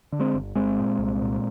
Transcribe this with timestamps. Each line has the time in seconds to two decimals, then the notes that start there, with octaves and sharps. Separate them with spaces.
0.12 D3
0.19 G#3 C4
0.34 G1
0.55 G1 G#3 C4
0.77 A#2
0.99 C2
1.21 A#2